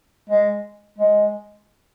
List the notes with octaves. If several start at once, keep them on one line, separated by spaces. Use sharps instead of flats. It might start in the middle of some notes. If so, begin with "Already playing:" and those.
G#3
G#3